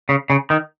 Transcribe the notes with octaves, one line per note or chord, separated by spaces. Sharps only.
C#3
C#3
D#3